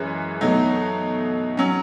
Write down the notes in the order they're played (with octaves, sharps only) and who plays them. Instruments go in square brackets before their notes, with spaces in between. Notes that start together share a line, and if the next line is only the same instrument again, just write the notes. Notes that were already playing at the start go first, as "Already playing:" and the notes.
Already playing: [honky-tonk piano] F#2 E3 G#3
B2 F#3 A3 D#4
F#3 C#4